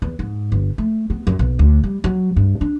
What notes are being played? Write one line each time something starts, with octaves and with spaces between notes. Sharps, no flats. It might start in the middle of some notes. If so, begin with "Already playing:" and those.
E2
G#2
G1
A3
B3
F#2
B1
D2
G3
F#3
G2
D4